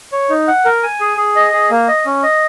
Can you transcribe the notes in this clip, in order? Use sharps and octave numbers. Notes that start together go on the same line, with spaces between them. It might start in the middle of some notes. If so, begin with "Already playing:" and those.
C#5
D#4
F#5
A#4
G#5
G#4
G#4
D#5
G#4
A#3
D#5
C#4
D#5